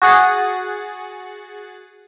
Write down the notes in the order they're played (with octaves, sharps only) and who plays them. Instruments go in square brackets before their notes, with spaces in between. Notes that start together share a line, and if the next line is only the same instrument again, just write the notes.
[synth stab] F#4 G#4 F#5 A6